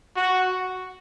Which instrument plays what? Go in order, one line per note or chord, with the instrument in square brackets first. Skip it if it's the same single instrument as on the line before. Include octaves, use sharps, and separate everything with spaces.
[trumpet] F#4